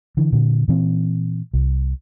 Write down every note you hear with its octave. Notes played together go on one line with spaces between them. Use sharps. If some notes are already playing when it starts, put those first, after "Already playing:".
D3 E3
A#2 D3
A#2 E3 C4
C2